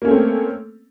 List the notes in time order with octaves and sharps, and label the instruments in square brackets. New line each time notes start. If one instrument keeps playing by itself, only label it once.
[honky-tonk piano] A#3
C#4
A3
C4